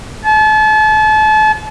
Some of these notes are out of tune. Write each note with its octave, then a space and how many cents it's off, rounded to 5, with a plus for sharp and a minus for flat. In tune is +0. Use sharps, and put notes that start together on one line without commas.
A5 -35